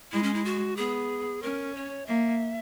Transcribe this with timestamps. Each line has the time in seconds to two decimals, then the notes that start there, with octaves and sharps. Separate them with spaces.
0.12 G#3 E4
0.23 C#4
0.34 E4
0.45 F#4
0.77 B3 G#4
1.42 C#4 A#4
1.75 C#5
2.06 A#3 E5